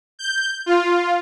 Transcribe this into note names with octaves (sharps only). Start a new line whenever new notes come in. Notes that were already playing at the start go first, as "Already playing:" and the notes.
G6
F4